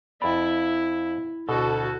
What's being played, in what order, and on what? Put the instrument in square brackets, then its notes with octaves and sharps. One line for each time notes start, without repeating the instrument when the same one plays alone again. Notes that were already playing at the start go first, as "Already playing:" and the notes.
[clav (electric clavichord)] F2 D5 [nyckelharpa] E4 [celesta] B5
[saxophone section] D2 A4 [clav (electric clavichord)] B2 [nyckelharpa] F#4